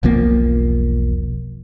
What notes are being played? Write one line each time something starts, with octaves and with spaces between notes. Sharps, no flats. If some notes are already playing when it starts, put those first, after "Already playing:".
E1 B1 F3 A#3